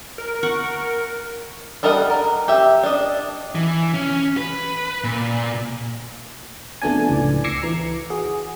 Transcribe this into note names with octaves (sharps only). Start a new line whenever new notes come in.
A#4
F#5 C#6
G3 A4 A#4 D#5 F#5
A#4
G4 E5
D4 D#5
E3
C#4
B4
A#2
F2 A3 B3 D4 D5 G#5
C#2 A2 D5
D6 E6 G#6 A#6 C7 C#7
E3 A#5
F#4 G#4